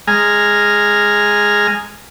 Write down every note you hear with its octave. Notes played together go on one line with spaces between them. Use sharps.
G#3 G#5 A#5 F6